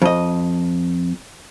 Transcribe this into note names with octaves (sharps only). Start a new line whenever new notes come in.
F2 D#5